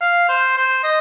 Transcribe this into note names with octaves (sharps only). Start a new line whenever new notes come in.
F5
C5
C5
D#5